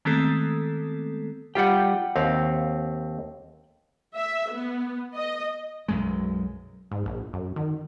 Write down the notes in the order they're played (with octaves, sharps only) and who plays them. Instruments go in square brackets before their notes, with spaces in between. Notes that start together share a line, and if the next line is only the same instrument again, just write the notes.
[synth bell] D#3 G#3 A3 B3 C4 A4
[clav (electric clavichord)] G3 F4 G4 [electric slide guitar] F#5 G5
[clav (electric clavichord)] D#2 C4 F5
[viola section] E5
B3
D#5
[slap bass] B1 F#2 G#3
[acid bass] G#2
A#1
F#2
D#3